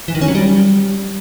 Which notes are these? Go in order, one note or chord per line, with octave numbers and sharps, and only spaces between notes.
E3
D#3
C#4
F#3
G3